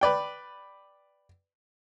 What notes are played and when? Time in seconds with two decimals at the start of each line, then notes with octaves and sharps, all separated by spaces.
0.01 B4 D5 G5